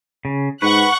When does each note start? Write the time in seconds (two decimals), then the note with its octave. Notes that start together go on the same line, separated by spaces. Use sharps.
0.25 C#3
0.62 G#2 B4 F#5 C#6 F#6